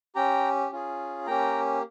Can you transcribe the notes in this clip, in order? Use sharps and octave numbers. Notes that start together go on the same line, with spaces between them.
C#4 G4 G5 A#5
C#4 F4 G#4
A#3 C#4 G4 G5 A#5